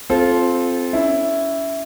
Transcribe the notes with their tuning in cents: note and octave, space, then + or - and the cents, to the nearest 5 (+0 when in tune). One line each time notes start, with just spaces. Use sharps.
C4 +0 F4 +0 A4 -25
C#4 +35 E4 +0